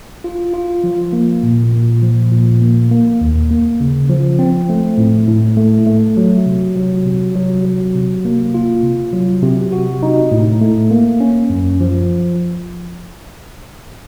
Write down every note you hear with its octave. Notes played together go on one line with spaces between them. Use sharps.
F4
F4
F3
A#3
A#2
A#2
F3
A#2
A#3
A#3
D#2
A#3
C#3
F3
C4
A3
A2
A2
A3
A3
F#3
C3
F#3
C3
F#3
F#3
C3
A#3
F4
C3
F#3
C3
F#4
D#4
A2
A3
A#3
C#4
F#2
F3